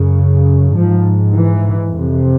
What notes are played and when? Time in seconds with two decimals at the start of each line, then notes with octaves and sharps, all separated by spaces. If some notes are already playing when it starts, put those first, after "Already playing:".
Already playing: F#2 C#3
0.75 G#2 F3
1.36 E3
1.97 F2 C3